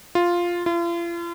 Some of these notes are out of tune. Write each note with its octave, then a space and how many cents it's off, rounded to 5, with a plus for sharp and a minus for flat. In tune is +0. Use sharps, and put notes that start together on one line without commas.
F4 +0
F4 -40